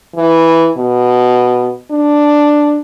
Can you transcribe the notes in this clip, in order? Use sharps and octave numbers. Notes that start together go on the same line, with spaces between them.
E3
B2
D4